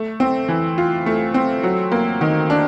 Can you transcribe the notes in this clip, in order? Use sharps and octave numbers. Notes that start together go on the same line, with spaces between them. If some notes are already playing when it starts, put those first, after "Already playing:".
Already playing: A3
C4
E3
F4
A3
C4
F#3
A#3
D#3
D4